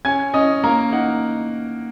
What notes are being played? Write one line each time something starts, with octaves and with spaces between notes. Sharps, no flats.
C#4 G#5 G#6
C#4 D#5 D#6
A#3 A#4 A#5
D#4 F#5